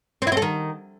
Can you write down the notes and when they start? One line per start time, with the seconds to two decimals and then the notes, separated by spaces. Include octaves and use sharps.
0.22 C4
0.27 E4
0.32 C4
0.37 A4
0.42 D#3